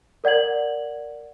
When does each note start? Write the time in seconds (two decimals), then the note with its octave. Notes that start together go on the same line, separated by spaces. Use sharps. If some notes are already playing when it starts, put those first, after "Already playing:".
0.24 A#4 D5 F#5 G#6 F#7